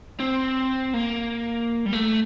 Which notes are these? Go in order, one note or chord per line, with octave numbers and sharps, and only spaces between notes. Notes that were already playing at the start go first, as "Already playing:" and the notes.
C4
A#3
G3
A3